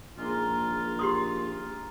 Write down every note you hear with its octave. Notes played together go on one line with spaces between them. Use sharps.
A#1 G#3 A#3 D#4 F4
G4 C6 D#6